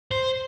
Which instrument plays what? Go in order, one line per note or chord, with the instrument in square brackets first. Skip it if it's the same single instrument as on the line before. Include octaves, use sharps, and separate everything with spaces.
[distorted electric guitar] C5